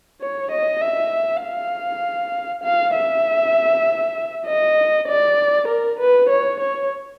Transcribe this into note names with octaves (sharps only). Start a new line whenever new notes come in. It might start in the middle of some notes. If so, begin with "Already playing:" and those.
C#5
D#5
E5
F5
F5
E5
D#5
D5
A#4
B4
C#5
C#5